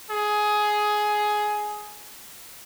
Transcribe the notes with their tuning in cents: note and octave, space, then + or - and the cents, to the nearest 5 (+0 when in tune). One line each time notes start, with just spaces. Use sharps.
G#4 +15